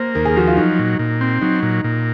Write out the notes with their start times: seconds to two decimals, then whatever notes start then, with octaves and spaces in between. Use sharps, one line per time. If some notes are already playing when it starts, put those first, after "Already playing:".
Already playing: A#3 C5
0.15 D#2 A#4
0.25 G#4
0.36 F3 F#4
0.48 F4
0.57 F#3 D#4
0.79 A#2
0.99 A#2
1.21 C4
1.41 F#3 D#4
1.63 A#2
1.84 A#2